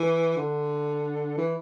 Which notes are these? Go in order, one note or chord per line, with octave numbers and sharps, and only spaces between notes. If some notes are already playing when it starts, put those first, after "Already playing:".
Already playing: E3
D3
E3